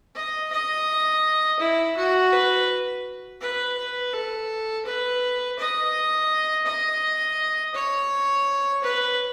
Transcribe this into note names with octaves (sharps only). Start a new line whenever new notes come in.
D#5
D#5
E4
F#4
B4
B4
B4
A4
B4
D#5
D#5
C#5
B4